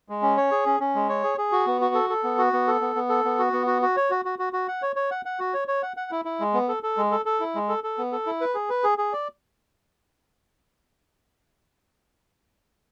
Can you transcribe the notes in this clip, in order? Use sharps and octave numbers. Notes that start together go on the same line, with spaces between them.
G#3
C#4
C#5
G#4
C#4
C#4
G#3
C#5
G#4
G#4
F#4
B3
F#4
A4
A4
B3
F#4
B3
A4
B3
B3
A4
B3
F#4
B3
F#4
F#4
C#5
F#4
F#4
F#4
F#4
F#5
C#5
C#5
F#5
F#5
F#4
C#5
C#5
F#5
F#5
E4
E4
G#3
B3
A4
A4
G#3
A4
A4
E4
G#3
A4
A4
B3
A4
E4
B4
G#4
B4
G#4
G#4
D5